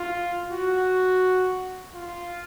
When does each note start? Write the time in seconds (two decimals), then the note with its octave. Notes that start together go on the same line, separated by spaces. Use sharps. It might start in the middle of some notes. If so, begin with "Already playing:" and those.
Already playing: F4
0.52 F#4
1.95 F4